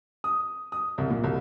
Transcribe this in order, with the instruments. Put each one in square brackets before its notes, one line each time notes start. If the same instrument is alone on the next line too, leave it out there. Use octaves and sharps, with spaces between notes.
[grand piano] D#6
D#6
C2
A#2
C2